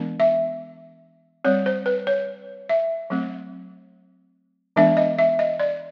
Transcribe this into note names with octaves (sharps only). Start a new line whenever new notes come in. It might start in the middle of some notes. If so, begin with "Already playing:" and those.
Already playing: E3 G#3 B3 D4
E5
G3 C4 C#5
C5
B4
C#5
E5
F#3 A3 C4
E3 G#3 B3 D4 E5
D#5
E5
D#5
D5